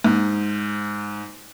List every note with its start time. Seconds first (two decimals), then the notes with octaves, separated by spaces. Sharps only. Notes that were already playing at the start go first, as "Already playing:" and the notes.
0.04 G#2